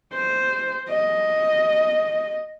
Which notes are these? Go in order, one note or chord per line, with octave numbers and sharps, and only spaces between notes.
C5
D#5